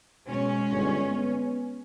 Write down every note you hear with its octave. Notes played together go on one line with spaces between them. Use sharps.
B2 G#3 C#4
G1
B3